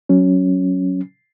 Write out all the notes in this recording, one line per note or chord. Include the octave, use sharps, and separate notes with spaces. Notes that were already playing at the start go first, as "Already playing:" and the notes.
F#3 C#4